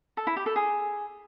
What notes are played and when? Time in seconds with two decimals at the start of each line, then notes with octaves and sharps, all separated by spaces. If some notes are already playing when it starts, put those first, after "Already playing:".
0.17 A4
0.27 E4
0.36 G4
0.46 A4
0.56 G#4